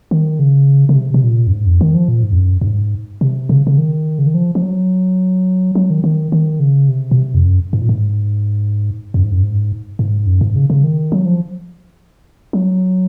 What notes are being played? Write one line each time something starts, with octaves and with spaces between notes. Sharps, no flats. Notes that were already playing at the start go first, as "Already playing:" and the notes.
D#3
C#3
C#3
C3
C3
A#2
F#2
G#2
F2
D#3
F3
A#2
G#2
F2
F#2
F#2
G#2
C3
C#3
C#3
D#3
C#3
D#3
F3
F3
F#3
F#3
D#3
D#3
D#3
C#3
C3
A#2
C3
F2
F#2
G#2
A#2
G#2
F#2
G#2
F#2
G#2
G#2
F#2
G#2
C#3
C#3
D#3
F#3
F3
F#3